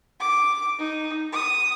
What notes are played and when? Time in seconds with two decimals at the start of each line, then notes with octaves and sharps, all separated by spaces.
0.20 D6
0.79 D#4
1.32 D#6